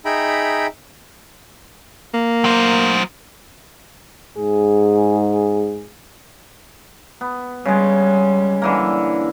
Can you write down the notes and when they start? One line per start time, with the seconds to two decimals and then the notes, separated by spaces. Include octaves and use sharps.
0.05 D#4 G#4 E5 G5 A#5 B5
2.14 A#3
2.44 F#3 C5
4.37 G#2 G#4
7.21 B3
7.65 C#3 G3 G#3
8.62 D3 E3 A#3